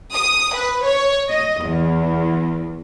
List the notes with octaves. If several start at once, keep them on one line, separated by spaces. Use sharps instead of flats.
D#6
B4
C#5
D#5
E2